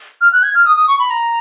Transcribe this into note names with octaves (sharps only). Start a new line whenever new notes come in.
F6
F#6
G#6
F6
D#6
D#6
C#6
B5
A#5